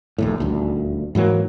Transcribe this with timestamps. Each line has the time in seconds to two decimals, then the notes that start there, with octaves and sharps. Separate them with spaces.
0.18 A#1 D#2 A2
0.40 D#1 D2
1.15 G#2 E3 F#3 A#3